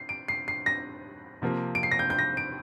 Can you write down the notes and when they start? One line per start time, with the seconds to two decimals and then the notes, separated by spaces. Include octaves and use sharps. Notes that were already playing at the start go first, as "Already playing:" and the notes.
Already playing: C7
0.09 D7
0.28 C7
0.48 C7
0.66 A#6
1.42 C3 F3 A#3
1.75 D7
1.83 C7
1.91 A#6
1.99 G6
2.10 G6
2.19 A#6
2.37 D7